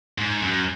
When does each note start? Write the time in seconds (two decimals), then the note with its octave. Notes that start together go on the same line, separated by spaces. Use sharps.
0.18 G#2
0.42 F#2